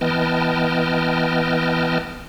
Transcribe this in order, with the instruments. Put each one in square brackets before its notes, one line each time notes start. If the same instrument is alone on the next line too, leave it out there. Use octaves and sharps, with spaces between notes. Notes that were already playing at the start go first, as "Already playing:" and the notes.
[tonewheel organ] E3 B3 D#5 G5 A5 F6